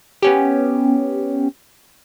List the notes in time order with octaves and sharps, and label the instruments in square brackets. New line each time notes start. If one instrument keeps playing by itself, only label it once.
[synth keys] B3 C#4 G4